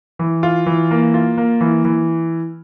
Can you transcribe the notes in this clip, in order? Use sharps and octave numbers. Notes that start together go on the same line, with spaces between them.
E3
F4
E3
A#3
F4
A#3
E3
E3